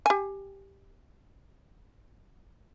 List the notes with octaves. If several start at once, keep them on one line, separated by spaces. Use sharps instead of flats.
G4 G#5